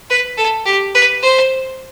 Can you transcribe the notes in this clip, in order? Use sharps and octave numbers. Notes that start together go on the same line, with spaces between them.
B4
A4
G4
B4
C5